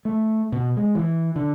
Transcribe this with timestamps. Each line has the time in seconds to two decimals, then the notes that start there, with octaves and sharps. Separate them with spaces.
0.05 A3
0.52 B2
0.77 G#3
0.95 E3
1.36 D3